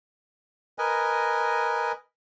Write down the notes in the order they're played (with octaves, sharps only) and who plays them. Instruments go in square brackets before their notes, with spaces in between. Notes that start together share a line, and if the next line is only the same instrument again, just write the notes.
[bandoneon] A#4 B4 D#5 G#5